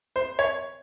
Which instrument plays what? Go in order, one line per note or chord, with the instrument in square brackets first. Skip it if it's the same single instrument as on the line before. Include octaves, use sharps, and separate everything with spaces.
[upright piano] C5
C#5